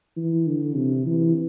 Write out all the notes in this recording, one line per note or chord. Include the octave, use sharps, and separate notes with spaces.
E3
D3
C3
E3